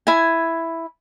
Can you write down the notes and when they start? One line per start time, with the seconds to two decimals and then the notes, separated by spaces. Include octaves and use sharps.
0.07 E4 G#5